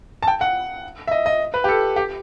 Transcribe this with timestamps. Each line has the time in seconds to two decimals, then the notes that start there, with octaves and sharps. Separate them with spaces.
0.23 A5
0.27 G5
0.41 F#5
1.07 E5
1.11 D#5
1.26 D#5
1.54 B4
1.64 G4
1.68 A4
1.96 G4